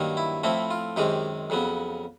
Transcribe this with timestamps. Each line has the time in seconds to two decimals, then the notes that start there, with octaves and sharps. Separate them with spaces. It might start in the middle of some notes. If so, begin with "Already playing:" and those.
Already playing: G2 D#3 F#3 A#3
0.17 E4
0.44 A2 F3 A3 C4 E4
0.71 F4
0.96 F#2 D#3 G#3 C4 G4
1.50 F2 C#3 F#3 B3